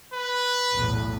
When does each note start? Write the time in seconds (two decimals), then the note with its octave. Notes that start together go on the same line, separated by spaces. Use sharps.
0.14 B4
0.74 B1 E2 A2